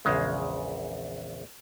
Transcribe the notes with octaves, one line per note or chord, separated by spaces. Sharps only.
A#1 E2 C#3 G#3